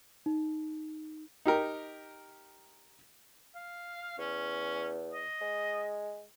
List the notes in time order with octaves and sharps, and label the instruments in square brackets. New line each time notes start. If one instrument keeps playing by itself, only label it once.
[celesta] D#4
[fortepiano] D#4 G4 A#4
[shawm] F5
[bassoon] E2 [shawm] C#4
[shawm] D#5
[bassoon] G#3